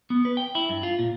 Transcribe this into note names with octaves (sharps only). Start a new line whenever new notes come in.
B3
B4
G5
E4
G2
F4
A#2